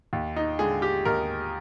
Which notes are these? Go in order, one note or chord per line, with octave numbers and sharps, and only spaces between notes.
D#2
D#4
D3 G#3 G#4
G4
D#2 A#4